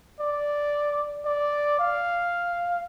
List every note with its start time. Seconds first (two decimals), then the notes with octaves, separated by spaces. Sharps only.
0.20 D5
1.25 D5
1.79 F5